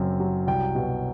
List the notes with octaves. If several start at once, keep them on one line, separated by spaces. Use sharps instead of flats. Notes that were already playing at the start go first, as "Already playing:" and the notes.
Already playing: F#1 F#2 C4
F#3
C2 G5
B2